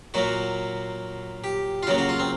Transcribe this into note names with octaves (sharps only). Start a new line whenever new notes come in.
A#2 F#3 A#3 F#4
G4
F4
C#3 F#3 A#3 F#4
F#4
F4
C4